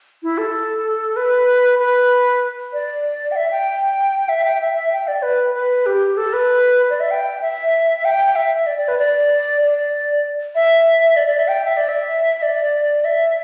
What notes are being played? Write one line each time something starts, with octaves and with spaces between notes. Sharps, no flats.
E4
A4
B4
B4
D5
G5
E5
G5
E5
G5
E5
E5
G5
D5
B4
B4
G4
A4
B4
D5
E5
G5
E5
G5
E5
D5
D5
B4
D5
D5
E5
D5
D5
E5
G5
E5
D5
E5
D5
E5